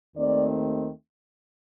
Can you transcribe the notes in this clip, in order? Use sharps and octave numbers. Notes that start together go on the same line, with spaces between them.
D#2 D#3 A3 C4 D5